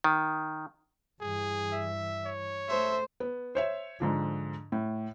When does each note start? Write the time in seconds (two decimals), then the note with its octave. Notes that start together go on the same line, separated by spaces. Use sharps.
0.04 D#3
1.21 G2 E3 G#4
1.73 E5
2.25 C#5
2.69 A3 A4 C5 E5
3.20 B3
3.55 C5 C#5 E5
4.00 G#2 D3 F3
4.72 A2